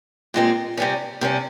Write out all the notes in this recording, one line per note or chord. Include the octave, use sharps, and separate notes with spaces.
A#2 G#3 C4 G4
C3 G3 C#4
C3 G3 C#4